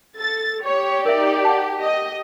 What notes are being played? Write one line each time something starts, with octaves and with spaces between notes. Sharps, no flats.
A4 A6
G4 C#5
D#4 A#4 D5 E5
F#5 A5
D#5